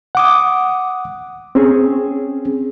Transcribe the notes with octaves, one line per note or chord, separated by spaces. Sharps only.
F#5 D6 D#6
C4 C#4 G#4